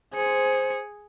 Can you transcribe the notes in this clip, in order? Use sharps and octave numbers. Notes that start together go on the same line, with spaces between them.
G#4 C5 C#7